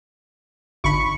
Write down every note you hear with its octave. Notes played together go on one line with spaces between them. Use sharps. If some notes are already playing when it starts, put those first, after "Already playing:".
G#1 D3 B5 C#6